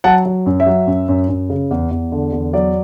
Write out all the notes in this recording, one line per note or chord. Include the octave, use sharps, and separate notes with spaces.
F#3 F#5 A5
F#3
F#2
E5
F#3
F#2
F#2
F#2
C#3
E2
E2
D3
E2
F#3 D5